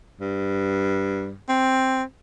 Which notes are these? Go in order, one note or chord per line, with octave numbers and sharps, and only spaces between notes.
G2
C4